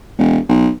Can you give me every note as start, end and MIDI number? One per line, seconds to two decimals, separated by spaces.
0.18 0.38 28
0.49 0.70 35